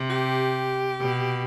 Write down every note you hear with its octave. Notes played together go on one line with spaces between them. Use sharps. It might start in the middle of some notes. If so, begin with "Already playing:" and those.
Already playing: C3
G4
B2